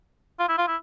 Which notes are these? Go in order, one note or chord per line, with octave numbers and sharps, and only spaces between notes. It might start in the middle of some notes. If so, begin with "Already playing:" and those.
F4
E4
F4
E4